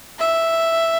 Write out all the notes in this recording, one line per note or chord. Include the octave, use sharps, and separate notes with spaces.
E5